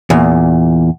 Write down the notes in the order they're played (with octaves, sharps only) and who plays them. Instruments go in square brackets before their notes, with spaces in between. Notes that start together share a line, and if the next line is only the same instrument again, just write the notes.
[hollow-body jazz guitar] E2 A#2